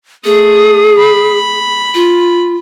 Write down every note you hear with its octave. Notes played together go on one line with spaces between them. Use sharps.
A3 G#4 D#6
B5
F4